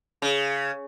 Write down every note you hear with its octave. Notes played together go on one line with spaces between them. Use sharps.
C#3